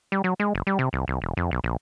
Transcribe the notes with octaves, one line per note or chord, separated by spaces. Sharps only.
G3
F#3
G#3
F#1
G3
C3
C2
C2
E1
F2
B1
A#1